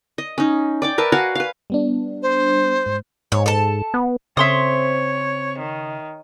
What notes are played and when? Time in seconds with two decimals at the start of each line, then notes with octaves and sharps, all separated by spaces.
0.18 D#5
0.38 C#4 D#4
0.82 D5 G5 D6
0.98 A#4 B4 E5 A5
1.12 F#4 F5 F#5 G#5
1.35 B4 F5
1.70 G3 B3 D4
2.23 C5
2.86 G#2
3.32 G#2 C#5
3.46 A4 A5
3.94 B3
4.37 C#3 C4 A4 C5 C#5 E5 C6 D#6
5.59 D#3